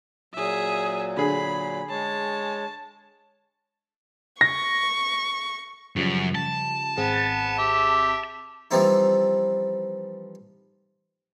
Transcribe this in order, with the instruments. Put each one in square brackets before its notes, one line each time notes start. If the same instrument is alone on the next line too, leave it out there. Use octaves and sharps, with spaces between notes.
[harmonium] A#2 F#3 [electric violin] G#4 E5
[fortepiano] D3 G#4 [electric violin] B5
[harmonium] G#3 C#5 [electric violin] A5
[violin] C#6 [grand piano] A#6
[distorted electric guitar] F#2 [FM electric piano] C#3 F3 G3
[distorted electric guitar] A5
[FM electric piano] G#1 C4 G#4 [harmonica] B3
[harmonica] G4 E5
[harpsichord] E3 F3 G3 C4 D#4 E4